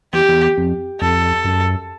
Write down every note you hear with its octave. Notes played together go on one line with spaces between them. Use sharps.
E2 G4
E2
F2
F2 A4
F#2